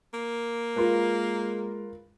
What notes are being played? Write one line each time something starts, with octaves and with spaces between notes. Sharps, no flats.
A#3
G#3 F4 A#4 B4